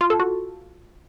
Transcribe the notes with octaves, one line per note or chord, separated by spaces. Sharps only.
F4
A4
F#4